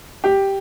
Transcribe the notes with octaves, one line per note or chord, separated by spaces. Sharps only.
G4